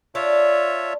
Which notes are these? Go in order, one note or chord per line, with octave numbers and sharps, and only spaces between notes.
D4 F4 C#5 E5